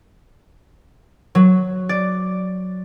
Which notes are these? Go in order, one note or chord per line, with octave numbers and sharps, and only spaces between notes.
F#3
D5